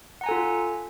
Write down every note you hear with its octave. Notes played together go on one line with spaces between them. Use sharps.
F4 A4 F#5 G#5 A#5